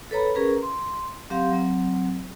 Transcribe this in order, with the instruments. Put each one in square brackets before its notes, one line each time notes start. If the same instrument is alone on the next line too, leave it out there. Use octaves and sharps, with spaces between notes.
[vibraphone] A4 B4 C#5 A#5 B5
C#4 G#4 A#4 B4 A#5
C6
F#3 C4 G4 F5 C6
F#3 C4